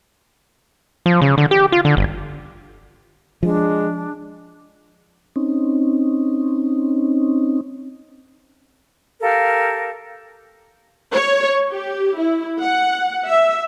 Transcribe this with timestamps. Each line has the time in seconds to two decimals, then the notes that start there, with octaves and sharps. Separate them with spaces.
1.06 F3
1.22 C#3
1.38 D3
1.51 G4
1.72 F4
1.85 D3
1.97 G1
3.43 F3 G#3 D4
5.36 C4 C#4 D#4
9.21 G4 A4 A#4 F5
11.13 C#5
11.72 G4
12.17 E4
12.62 F#5
13.30 E5